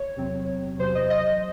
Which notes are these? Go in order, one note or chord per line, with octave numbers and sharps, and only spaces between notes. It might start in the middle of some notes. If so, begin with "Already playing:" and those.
Already playing: C#5
E2 C3 F#3 C4
E2 C3 F#3 C5
D#5
D#5